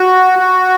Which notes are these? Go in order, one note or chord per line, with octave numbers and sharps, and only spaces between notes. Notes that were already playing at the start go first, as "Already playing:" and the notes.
Already playing: F#4
F#4